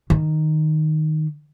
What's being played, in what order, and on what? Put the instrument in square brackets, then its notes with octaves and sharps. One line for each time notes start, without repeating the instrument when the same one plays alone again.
[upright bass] D#3